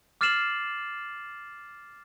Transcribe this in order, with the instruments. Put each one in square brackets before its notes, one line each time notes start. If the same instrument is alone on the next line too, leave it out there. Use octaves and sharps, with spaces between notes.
[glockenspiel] D6 F6 A6 C7 E7 F#7